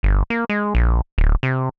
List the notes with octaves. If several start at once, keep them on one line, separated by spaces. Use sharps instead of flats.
G1
A#3
G#3
A#1
D1
C3